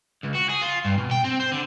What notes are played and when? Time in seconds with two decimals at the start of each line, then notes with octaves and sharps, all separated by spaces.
0.24 C#2
0.35 F#4
0.50 G#4
0.62 F4
0.85 G2
0.98 B2
1.11 G5
1.24 C4
1.40 C5
1.52 D3